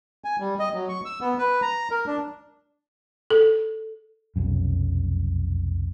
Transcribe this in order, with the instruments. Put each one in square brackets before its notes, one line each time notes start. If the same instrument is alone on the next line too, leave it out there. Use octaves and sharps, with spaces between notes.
[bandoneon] G#5
G3
D#5
F#3
C#6
E6
B3
B4
A#5
A#4
D4
[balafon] A4
[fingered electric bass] F1 B1 F#2